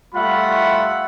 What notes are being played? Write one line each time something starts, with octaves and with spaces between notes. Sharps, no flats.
G3 A3 F4 E5 F#5 B5